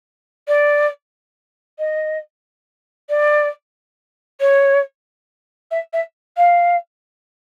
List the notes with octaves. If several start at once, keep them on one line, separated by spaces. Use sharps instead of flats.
D5
D#5
D5
C#5
E5
E5
F5